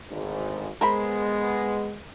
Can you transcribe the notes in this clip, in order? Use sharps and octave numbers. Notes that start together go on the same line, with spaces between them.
G#1 D2 G#2
G#3 B3 A#4 C5 B5